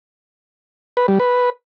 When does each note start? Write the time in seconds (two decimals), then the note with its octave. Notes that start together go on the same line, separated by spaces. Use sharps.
0.97 B4
1.08 G3
1.19 B4